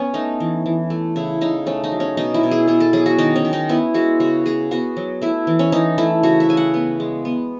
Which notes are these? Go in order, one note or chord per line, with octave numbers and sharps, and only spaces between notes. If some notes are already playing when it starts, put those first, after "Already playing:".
Already playing: B3 C#4
A3 D#4
E3
E3
A3
C#3 E4
C#3 D#4
A3 C#4
D#4
F#3
C#4
B2 D#4
E4
B2
G#4
B3 G#4
A4
F#3 G#4
F#4
D#3 D#4
C#4
D#3
D#4
B3 E4
G#3 F#4
C#3 F#4
C#3 G#4
B3 F#4
F#3
A3 E4
E3
C#4
E3 D#4
A3 E4
C#3 F#4
E5
C#3 G#5
F#5
B3
G#3
B3